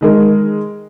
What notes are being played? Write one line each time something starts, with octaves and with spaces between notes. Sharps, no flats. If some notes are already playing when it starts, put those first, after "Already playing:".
D#3 G#3 A#4